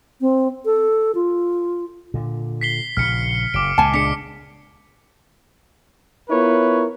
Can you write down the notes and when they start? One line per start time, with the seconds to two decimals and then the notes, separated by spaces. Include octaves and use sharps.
0.21 C4
0.65 A4
1.15 F4
2.14 A#2 D3
2.61 B6 C7 G7
2.97 A#1 C#3 F6 C#7
3.54 F#1 D6 D7
3.78 C#2 A#2 G#5 A5
3.94 D4 G#4 B6 C#7
6.30 B3 E4 F4 A#4 B4 C#5